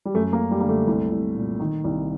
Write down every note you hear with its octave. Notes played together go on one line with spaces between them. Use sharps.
G3
F#2 A3
A#3
F#2
G3
D3 A#3
A3
C2
C2
A#2
D#3
C2